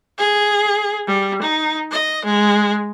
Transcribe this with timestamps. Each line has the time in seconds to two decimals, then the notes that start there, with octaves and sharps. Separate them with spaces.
0.19 G#4
1.08 G3
1.42 D#4
1.92 D#5
2.25 G#3